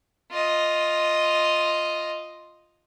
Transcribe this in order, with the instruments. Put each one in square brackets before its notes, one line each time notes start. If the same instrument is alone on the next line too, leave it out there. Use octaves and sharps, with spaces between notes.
[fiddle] F4 D#5